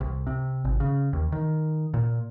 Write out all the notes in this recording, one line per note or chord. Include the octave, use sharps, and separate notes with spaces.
C2
C3
G#1
C#3
D#2
D#3
A#2